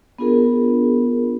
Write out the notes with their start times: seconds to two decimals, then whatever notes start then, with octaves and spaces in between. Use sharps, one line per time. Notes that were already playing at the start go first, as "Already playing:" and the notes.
0.19 B3 D4 F4 G#4 A#4